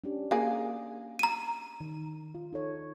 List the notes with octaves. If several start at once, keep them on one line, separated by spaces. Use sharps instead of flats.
C#4 D4 G4
A#3 G#4
A#5 D#7
D#3
F4
D#4 A4 C#5